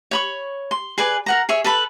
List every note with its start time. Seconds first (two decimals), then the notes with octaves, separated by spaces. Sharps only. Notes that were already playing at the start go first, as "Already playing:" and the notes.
0.11 C#5 B5 C#6
0.71 C6
0.98 G#4 B4 D5 G#5
1.26 A#4 F#5 A#5
1.49 G#4 C#5 E5
1.64 A4 B4 A5 B5